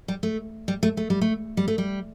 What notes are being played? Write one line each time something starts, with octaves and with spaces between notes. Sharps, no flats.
G3
A3
G3
A3
A3
G3
A3
G3
A3
G3